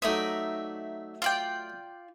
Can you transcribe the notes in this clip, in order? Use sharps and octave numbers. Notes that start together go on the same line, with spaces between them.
F#3 A3 D#4 D5 E5 D#6
F4 D5 G5